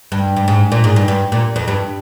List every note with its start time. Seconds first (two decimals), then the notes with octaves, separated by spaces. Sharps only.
0.12 G2
0.36 G2
0.48 G#2
0.72 A#2
0.84 G#2
0.96 G2
1.08 G2
1.32 A#2
1.56 F2
1.68 G2